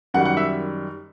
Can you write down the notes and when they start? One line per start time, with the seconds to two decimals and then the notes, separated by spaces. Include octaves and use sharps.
0.14 F#2 D#3 G3 F#5
0.25 F#5
0.37 E5